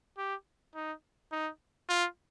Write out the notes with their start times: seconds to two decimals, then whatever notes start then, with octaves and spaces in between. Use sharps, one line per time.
0.18 G4
0.75 D#4
1.32 D#4
1.89 F4